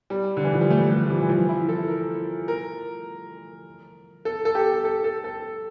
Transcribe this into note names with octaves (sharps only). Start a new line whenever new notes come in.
G3
D3
E3
F3
G3
A3
A3
G3
G3
F3
E3
F3
E4
A4
A#4
A#4
A4
A4
G4
A4
A4
A4